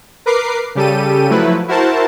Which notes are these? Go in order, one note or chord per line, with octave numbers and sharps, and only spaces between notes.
A#4 B4 D6 C7
C#3 G3 G4 A4 D#7
F3 F#3 A3 E4 B4
E4 F#4 A#4 C5 A5